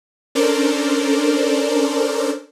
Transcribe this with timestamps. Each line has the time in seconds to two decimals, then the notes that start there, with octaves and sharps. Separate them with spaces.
0.35 C#4 D4 A4 A#4 C5 D5